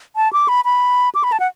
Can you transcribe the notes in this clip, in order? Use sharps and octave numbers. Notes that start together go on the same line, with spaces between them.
A5
D6
B5
B5
D6
B5
A5
F#5